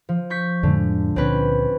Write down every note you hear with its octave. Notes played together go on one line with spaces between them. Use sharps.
F3
C#6 G6 B6
F2 A2 D3 G#3
C#2 A#2 D3 C4 C#4 B4